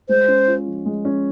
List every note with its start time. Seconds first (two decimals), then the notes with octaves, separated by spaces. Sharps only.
0.09 G#3 C5
0.28 C#4
0.47 F4
0.67 F3
0.86 G#3
1.05 C#4